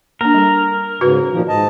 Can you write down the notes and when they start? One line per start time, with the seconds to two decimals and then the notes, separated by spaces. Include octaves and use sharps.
0.21 A#3 D4 A#4
0.34 G3 A4
1.01 G#2 C#3 F#4 B4
1.31 A#2 D#3 F3
1.48 G#2 D#5 A5